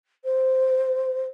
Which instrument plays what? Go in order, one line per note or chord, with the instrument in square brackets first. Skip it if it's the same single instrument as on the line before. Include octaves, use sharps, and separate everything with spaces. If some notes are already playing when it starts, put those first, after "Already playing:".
[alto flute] C5